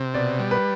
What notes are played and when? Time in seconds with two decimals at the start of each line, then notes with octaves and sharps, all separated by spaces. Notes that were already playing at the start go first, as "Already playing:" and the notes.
Already playing: C3
0.14 B2 D5
0.39 G3
0.51 B4